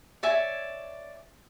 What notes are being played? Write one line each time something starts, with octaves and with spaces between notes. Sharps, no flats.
C#5 D5 E5 G#5